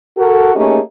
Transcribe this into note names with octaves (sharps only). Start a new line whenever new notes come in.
F#4 A4 A#4
A3 A#3 C#4 D#4 G4 G#4